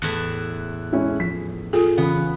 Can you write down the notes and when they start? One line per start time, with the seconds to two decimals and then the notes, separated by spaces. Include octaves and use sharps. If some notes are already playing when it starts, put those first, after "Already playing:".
0.02 E2 A2 E5 F#6
0.93 G#3 C#4 E4
1.20 F3 B6
1.73 F4 G#4 A4
1.98 C#3 E3 B3